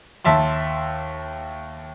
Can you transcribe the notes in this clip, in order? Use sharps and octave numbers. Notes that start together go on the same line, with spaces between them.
D#2 E5 A5 C6